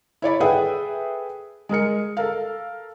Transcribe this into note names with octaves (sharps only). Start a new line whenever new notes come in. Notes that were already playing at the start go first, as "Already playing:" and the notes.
E4 C#5 D5 B5
G#4 A4 B4 E5 F#5 G5
G#3 G#4 A#4 C#7
A4 A#4 F5